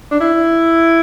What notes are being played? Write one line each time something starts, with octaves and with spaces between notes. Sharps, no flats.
D4
E4